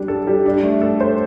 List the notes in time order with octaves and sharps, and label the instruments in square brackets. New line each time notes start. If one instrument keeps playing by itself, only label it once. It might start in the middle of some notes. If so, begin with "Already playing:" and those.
Already playing: [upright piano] G3 D4
A4
G3
D4
A3
A4
C5